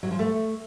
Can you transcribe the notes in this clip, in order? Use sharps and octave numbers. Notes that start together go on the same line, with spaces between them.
F#3
F3
A3